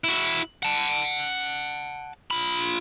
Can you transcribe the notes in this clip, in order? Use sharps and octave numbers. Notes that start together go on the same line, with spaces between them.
E4 F#4
F#5 A5
F4 B5